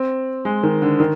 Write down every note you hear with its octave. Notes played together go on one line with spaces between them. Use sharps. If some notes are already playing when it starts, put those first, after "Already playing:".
Already playing: C4
G#3
D#3
D3
D#3